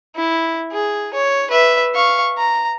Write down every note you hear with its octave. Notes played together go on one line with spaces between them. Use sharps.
E4
G#4
C#5
B4 E5
F5 C#6
A#5